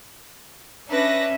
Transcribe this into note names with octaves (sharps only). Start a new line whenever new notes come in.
C#4 D4 B4 E5 A#6